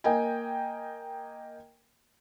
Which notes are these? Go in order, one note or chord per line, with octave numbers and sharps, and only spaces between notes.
A#3 D#5 G5 G#5